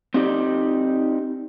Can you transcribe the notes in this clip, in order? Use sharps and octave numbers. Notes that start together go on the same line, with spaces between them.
C4 D#4 G4 D5